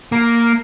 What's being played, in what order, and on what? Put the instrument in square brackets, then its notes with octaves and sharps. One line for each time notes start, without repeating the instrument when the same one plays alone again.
[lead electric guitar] A#3